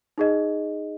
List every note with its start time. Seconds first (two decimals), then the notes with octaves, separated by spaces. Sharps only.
0.18 D#4 G#4 D#5